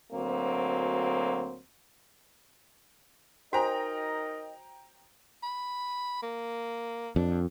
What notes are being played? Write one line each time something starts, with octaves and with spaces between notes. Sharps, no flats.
D2 F#3 A#3 C4
D#4 F#4 A#4 C5 D#5 G5 G#5 A#5
B5
A#3
F2 D4